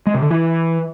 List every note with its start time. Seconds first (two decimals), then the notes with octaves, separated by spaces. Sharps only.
0.07 G#3
0.15 C3
0.22 D3
0.30 E3